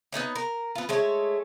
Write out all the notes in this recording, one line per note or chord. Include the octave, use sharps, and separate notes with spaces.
B3 C#4 D#4 C#5
A#4
B3 F4
G#3 A3 C#5